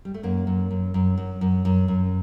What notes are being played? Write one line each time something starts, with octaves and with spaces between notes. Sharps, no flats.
G3
A3
F#2 A#3
F#2
F#2
F#2
F#2
F#2
F#2
F#2